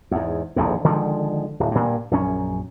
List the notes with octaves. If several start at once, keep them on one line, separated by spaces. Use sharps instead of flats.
E2 G#2
D#1 A#1 E2 G#2
D3 D#3 F3 G#3
D1
G2 A#2
A#1 F#2 C#4